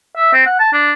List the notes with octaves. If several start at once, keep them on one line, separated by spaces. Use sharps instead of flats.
E5
C4
F#5
A5
D4